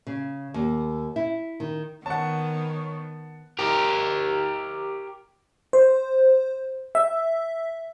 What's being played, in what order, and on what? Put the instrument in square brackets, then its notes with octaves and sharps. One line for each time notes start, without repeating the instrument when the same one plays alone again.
[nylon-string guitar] C#3
D#2
E4
D#3
[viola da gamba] D#3 B3 [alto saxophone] C#5 [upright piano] F#5 A5
[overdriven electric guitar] G4 A#4
[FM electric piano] C5
E5